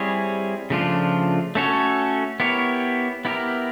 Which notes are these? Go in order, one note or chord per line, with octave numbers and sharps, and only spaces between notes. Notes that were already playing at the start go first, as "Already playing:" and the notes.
Already playing: G3 C4 E4 G#4 C#5
C#3 F3 A3 D4 F4
A3 C#4 F#4 A4 C#5
B3 E4 G4 A#4 C#5
B3 E4 G4 A#4